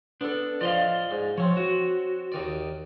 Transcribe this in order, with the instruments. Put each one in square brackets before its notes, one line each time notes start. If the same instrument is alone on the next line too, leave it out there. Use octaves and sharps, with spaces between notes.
[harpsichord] B3 A4 [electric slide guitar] D4
[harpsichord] F3 [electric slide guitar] D5 D#5 F5
[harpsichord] G#2
[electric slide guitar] F3 [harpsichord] C4 C#5
[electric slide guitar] F#4
[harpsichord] D#2 D#3 D5